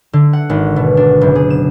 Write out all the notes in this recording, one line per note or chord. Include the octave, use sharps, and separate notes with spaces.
D3
F#5
G#1
B2
D4
F#1
G#4
E7